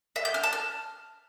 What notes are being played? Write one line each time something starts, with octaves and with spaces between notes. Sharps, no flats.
E5
G6
F6
A5
F6